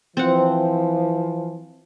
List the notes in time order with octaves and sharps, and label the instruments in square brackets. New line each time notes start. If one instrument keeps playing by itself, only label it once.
[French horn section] E3 F3 [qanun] C4 F#5